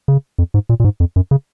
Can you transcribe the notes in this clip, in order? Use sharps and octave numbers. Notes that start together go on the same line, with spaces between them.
C#3
F2
G#2
A#2
A#2
G#2
F2
F#2
C#3